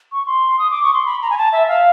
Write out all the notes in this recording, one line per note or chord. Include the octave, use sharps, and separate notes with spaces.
C#6
C6
D#6
D6
C#6
C6
B5
A#5
G#5
A5
E5
F5